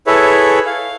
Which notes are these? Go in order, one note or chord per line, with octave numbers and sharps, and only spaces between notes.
E4 G#4 A4 B4 C#5 E5
F5